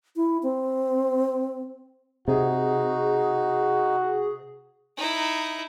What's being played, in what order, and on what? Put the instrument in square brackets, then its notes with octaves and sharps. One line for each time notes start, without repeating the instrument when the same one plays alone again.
[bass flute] E4
C4
[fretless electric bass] C3 [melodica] D#4 [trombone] F#4 [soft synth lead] G#4
[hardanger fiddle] D#4 E4